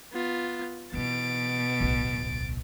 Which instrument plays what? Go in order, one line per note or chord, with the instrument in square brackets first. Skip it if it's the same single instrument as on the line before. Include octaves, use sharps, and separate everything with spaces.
[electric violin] B3 F4
[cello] B2 [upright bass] E3 E4 [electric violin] A6 D7
[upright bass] D1 B1